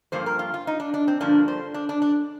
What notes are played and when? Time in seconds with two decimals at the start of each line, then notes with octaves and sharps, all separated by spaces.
0.12 G2 F3 A#3 C5
0.26 A#4
0.39 F4
0.54 F4
0.67 D#4
0.80 D4
0.94 D4
1.08 C4
1.21 G2 D3 F3 A#3 D4
1.48 C5
1.74 D4
1.89 D4
2.02 D4